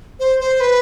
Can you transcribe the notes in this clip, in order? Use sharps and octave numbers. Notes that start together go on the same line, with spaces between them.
C5
C5
B4